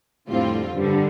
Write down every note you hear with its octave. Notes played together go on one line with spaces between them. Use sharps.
F2 A2 D3 G3 C4 F4
G2 D3 G3